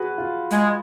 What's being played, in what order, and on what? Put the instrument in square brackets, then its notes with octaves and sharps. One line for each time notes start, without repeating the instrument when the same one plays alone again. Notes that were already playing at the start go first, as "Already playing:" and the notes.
Already playing: [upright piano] F#4 G#4 B4
F4
[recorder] G#3